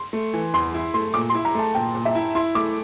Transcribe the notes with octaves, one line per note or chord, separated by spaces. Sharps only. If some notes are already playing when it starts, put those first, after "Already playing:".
Already playing: C6
A3
E3
E2 C6
E4
A3 C6
A#2 D6
C6
E4
A#5
A3 A5
A#2 G5
A#2
E5
E4
E4 C6
A3 D6